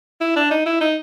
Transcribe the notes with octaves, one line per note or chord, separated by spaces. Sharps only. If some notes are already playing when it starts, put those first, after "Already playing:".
E4
D4
D#4
E4
D#4